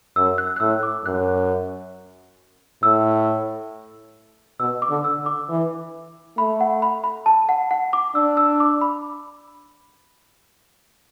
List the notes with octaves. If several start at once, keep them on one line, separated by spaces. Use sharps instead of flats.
F#2 E6
F#6
F#6
A2 E6
D6
F#2 F#6
A2 E6
B2 E6
D6
D3
E6
D3
D6
E3
A3 B5
F#5
B5
B5
A5
F#5
F#5
D6
D4 E6
E6
D6
B5